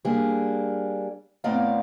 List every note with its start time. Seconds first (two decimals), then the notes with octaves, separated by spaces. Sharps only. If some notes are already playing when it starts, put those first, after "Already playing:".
0.05 G3 A#3 D4 G#4
1.44 A2 B3 C4 D5 F5 A#5